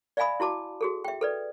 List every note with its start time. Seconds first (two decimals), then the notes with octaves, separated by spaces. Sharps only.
0.17 D5 E5 F5 G#5 B5 D#6
0.40 E4 F#4 A5 D6
0.81 F#4 G#4 A4
1.05 E5 G5
1.21 A4 B4 D5